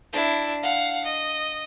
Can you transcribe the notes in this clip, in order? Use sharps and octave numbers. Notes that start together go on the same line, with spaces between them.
D4 E4
F5 F#5
D#5